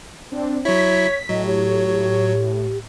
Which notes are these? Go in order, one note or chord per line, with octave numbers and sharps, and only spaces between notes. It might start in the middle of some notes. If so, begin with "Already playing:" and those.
C4 D4
F#3 E4 C#5 B6
A2 F#3 D#5
G4 C#5